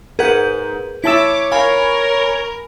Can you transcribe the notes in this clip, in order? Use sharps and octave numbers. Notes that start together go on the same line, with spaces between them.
G#2 G#4 A#4 B4 F#5 G6
E4 C#5 A5 D6 E6 B6
A#4 F5 G#5 B5